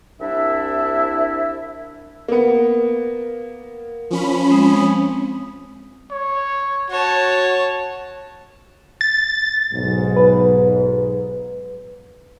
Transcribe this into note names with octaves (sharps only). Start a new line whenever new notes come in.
C2 D4 E4 E5
A#3 B3
F3 C#4 B5
G#3 C4 D#6
C#5
F#4 C#5 A5
A6
B1 G#2
B4